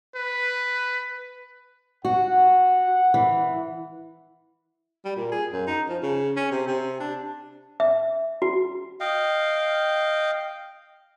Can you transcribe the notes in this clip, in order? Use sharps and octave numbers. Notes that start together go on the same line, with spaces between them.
B4
F#4 F#5
E3
G3
A#2
G#4
F#2
D#4
F3
C#3
C#4
C3
C3
D4
E5
F#4
D#5 F5 G5